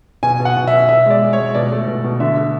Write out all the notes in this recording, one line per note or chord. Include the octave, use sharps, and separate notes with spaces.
B2 G#5
B2
F#5
B2
E5
B2
B2 E5
G#3 D5
G#3
C#5
G#3
B2 D5
A3
B2
B2
D3 E5
A3